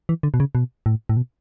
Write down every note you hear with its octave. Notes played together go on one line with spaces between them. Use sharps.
E3
D3
B2
C#3
B2
A2
A2
B2